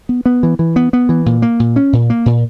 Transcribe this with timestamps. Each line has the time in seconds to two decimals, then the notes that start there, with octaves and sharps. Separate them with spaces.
0.09 B3
0.26 B3
0.43 E3
0.59 E3
0.76 B3
0.93 B3
1.09 E3
1.26 A#2
1.42 A#3
1.60 A#2
1.76 C#4
1.93 A#2
2.10 A#3
2.26 A#2